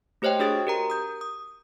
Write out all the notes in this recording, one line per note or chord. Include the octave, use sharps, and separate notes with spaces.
A3 G4 C5 C#5 D#5 G5
D4 F#4 G#4 D#6 A6 D7
G4 A#4 A#5
D#6 G6
D#6